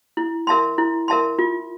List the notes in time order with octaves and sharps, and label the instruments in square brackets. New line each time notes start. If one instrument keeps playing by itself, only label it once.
[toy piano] E4
A#4 E5 A5 C6
E4
A#4 E5 A5 C6
F4